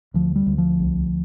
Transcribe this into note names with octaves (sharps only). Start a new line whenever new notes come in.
D2 F3
G3
D2
F3
C2